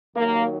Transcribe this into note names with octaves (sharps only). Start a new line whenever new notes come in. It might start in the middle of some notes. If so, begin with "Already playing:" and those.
D#2 D#3 F#3 A#3